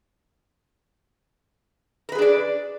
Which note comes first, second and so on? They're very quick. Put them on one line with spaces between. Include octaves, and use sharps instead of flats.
A#4 B4 G#4 D4 D5